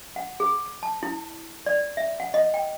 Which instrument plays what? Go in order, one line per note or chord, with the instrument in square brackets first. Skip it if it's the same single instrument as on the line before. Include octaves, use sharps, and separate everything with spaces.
[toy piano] F#5
G#4
A5
E4
D5
E5
F#5
D#5
G5